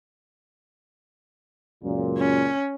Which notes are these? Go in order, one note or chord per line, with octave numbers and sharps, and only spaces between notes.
C#2 F#2 A#2
C#4